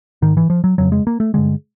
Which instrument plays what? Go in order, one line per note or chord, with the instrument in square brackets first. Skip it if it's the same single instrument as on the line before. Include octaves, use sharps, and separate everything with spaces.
[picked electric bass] G#2 D#3
E3
F3
F#3
F2 C#3 F#3
G#3
A#3
A3
G2 D3 G#3